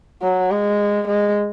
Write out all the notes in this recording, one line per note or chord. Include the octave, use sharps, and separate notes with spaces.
F#3
G#3
G#3